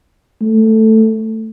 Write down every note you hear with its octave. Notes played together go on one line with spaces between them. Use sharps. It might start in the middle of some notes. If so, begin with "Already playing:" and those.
A3